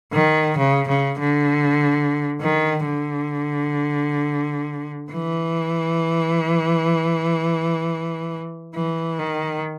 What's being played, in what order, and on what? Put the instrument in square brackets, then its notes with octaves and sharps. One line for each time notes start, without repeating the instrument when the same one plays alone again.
[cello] D#3
C#3
C#3
D3
D#3
D3
E3
E3
D#3